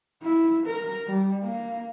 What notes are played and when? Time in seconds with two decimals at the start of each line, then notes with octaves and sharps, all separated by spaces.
0.23 E4
0.67 A#4
1.07 G3
1.43 A#3